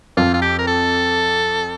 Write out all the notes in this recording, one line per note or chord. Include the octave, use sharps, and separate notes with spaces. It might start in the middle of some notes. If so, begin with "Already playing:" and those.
F2 F4
F4
G4
A#4
A4